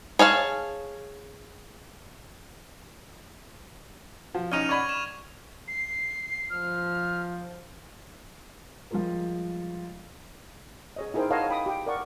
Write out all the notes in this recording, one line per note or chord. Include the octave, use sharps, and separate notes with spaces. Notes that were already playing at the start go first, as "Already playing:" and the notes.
G#4 C#5 F5 A5
F3
C#4 D#4 F6 D#7 F7
D5 B5 C#6 G#6 D#7
E7
C7
F3 F6
F3 G3 G#3 F4 A#4
G#4 C#5 D#5
D#4 E4 G#4 A#4 C5 G5
A#4 C#5 D#5 F5 F#5 A5
G5 B5 D#6
G4 G5
A#4 D5 F#5 C#6